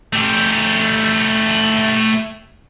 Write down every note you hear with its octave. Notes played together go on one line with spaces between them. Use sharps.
A3 G4